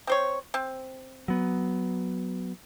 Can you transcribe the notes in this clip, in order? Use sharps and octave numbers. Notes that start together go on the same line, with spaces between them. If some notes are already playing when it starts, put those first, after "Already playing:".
C4 C5 C#5
C4
F#3 B3